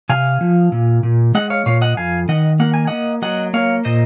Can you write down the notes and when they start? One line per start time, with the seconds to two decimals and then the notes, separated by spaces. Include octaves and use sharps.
0.09 C3 F5 G#5
0.41 F3
0.72 A#2
1.03 A#2
1.35 G#3 D#5 F#5
1.50 C#5 F5
1.66 A#2 C#5 F5
1.81 D#5 F#5
1.97 F2 F5 G#5
2.29 D#3 D#5 F#5
2.60 A#3 F#5
2.74 G#5
2.87 A#3 D#5 F#5
3.22 F#3 D#5 F#5
3.54 A#3 C#5 F5
3.85 A#2 C5 D#5